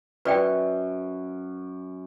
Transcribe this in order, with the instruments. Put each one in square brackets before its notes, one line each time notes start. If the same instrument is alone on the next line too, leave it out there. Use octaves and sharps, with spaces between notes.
[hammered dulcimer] F#2 [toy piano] B4 D5 G5